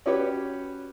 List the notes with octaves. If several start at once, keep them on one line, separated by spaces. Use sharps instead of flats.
C#4 F#4 G4 B4 C#5